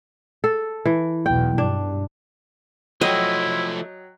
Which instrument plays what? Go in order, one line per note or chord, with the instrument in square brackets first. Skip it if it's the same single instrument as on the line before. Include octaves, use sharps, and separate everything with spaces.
[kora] A4
E3
[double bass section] B1 E2 B2 [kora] G5
[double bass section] G2 [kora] D4
[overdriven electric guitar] F3 A3 [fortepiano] F#3 G5 [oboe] E4 [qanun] D#5